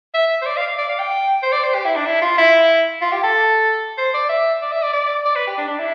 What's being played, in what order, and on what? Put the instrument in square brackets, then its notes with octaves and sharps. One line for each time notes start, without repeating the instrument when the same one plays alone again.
[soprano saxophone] E5
C5
D5
F5
D5
F5
G5
C5
D5
C5
G4
E4
D4
E4
F4
E4
F4
G4
A4
C5
D5
E5
D5
E5
D5
D5
D5
B4
G4
D4
D4
E4